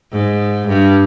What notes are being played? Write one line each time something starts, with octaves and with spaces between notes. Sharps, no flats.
G#2
G2